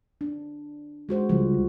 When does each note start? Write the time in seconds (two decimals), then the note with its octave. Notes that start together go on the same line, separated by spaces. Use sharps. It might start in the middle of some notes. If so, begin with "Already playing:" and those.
0.21 D4
1.09 G#3 F#4 C5
1.29 C#2 F3 G3